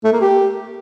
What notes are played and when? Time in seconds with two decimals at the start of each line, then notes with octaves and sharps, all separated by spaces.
0.04 A3
0.13 A#3
0.21 G4